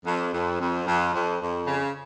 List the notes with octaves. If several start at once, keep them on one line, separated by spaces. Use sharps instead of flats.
F2
F2
F2
F2
F2
F2
C#3